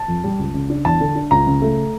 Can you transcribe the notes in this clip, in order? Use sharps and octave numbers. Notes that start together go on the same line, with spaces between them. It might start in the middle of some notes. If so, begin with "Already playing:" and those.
Already playing: A5
F2
G3
C#2
C#3
D4
E2 A5
D3
D4
C#2 A#5
C#3
A3